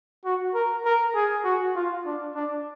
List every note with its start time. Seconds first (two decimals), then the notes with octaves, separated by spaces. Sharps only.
0.25 F#4
0.54 A#4
0.85 A#4
1.15 G#4
1.44 F#4
1.76 F4
2.06 D4
2.35 D4